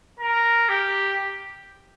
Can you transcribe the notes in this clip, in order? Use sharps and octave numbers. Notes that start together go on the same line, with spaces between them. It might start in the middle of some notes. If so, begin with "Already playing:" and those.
A#4
G4